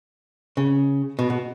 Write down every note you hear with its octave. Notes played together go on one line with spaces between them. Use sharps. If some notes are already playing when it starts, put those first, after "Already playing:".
C#3
B2
B2